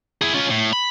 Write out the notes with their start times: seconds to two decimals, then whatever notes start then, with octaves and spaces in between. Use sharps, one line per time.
0.22 E4 G#4
0.34 C#4 F4
0.50 A2
0.73 B5